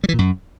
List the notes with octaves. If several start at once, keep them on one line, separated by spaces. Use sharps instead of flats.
G3
E3
A#2
F#2